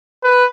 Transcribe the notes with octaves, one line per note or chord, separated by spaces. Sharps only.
B4